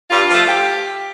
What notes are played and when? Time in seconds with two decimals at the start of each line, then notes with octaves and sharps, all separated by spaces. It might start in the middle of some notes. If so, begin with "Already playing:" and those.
0.11 G2 F4
0.30 F3 A3
0.49 G4